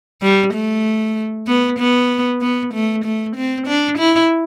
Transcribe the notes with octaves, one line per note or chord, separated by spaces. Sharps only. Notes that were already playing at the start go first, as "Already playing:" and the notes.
G3
A3
B3
B3
B3
A3
A3
C4
D4
E4